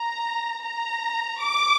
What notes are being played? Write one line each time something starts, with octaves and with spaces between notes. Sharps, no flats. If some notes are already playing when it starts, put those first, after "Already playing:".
Already playing: A#5
A#5
D6